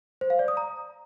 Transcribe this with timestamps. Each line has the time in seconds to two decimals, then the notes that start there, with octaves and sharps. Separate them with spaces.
0.21 C5
0.30 F5
0.39 D5
0.48 D#6
0.57 A#5